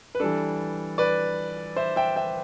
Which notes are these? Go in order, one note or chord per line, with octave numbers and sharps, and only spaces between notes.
B4
E3 G3 D4 A4
B4 D5
C5 E5
E5 G5
E5 G5